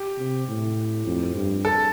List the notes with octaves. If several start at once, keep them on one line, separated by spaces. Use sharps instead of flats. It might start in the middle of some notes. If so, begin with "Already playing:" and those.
Already playing: G4
C3
A2
F2
G2
A4